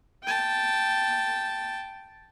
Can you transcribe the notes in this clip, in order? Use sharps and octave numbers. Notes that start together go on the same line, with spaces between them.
G5 A5